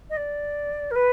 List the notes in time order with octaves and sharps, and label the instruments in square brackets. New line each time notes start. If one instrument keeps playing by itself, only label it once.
[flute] D#5
D5
A#4
B4